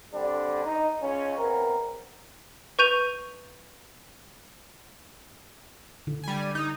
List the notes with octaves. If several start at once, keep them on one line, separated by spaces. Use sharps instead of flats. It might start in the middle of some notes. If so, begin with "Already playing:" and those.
D3 G3 C4 D4
D#4
C#2 C#4
E2 C4 A#4
B4 C#6 G6 D#7 F7
D3
G3 G#5
D#4